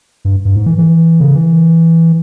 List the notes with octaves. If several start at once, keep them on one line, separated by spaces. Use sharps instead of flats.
G2
G2
G#2
E3
E3
C#3
E3